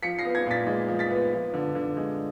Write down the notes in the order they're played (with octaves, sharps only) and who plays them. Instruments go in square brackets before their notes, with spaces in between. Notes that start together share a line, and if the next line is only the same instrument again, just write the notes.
[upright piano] F3 B6 C#7
A#6 C7
B3
G#6 A#6
A#2 A6 B6
G#3
F3
A6 B6
B3
F3
D3
D3
G#3